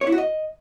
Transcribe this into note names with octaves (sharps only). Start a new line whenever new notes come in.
C#5
E4
F#4
D#5